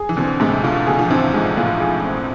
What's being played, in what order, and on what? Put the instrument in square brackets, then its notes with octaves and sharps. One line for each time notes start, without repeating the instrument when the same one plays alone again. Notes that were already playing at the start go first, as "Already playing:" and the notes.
Already playing: [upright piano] G#4
[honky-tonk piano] E3
[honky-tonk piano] B2 D3 [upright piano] C4
[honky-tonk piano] A2 C3 [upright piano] G#3
[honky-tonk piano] B2 D3 [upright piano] F4
[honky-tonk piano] B2 D3 [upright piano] G#4
[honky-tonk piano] F3
[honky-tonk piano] C3 E3 [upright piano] C4
[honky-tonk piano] G#2 [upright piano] G#3
[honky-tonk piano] A2 [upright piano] F4
[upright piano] G#4
C4